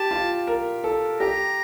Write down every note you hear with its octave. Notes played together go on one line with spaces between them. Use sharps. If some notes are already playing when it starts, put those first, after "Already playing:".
Already playing: G4 A5
F4
A#4
A4
G4 A#5